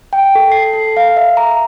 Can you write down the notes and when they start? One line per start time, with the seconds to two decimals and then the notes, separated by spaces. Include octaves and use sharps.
0.13 G5
0.35 A4
0.52 C7
0.73 A4
0.97 F5
1.17 E5
1.37 A#5